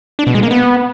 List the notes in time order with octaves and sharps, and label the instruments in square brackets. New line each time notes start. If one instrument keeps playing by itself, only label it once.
[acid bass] D4
B2
G#3
A#3
B3